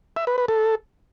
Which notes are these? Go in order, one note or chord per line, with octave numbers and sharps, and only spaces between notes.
E5
B4
B4
A4